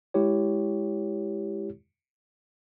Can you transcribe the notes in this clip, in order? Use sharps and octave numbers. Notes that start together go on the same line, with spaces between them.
G#3 E4 G4 C#5